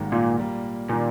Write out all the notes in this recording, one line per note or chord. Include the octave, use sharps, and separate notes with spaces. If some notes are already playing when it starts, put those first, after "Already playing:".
Already playing: G#1 G#2 D#3 G3 A#3
A#2
A#2 G3 A#3
A#2 D#3 G3